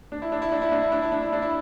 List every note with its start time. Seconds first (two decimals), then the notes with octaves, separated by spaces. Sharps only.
0.12 D4
0.22 E4
0.32 D4
0.42 E4
0.52 D4
0.62 E4
0.72 D4
0.82 E4
0.92 D4
1.02 E4
1.12 D4
1.22 E4
1.32 D4
1.42 E4